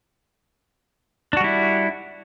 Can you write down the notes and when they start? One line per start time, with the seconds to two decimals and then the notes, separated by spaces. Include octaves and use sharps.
1.33 D4
1.37 F#4
1.40 G3
1.44 E4